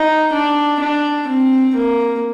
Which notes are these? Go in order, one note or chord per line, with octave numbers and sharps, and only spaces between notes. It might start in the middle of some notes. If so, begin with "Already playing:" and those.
Already playing: D#4
D4
D4
C4
A#3